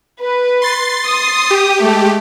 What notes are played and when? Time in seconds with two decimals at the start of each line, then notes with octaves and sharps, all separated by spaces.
0.21 B4
0.62 C6 A6 C7
1.06 D#6
1.51 G4
1.81 G#3 A3